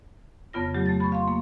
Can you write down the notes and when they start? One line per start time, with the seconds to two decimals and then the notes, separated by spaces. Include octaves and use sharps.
0.53 F2 C#3 B3 F4 A#6
0.74 F#3 A3 G4
0.86 A3 A6
1.00 B5 C#6
1.12 F5 C6
1.28 A#3